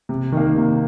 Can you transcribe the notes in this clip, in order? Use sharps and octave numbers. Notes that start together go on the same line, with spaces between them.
C3
D#3 A#3
C3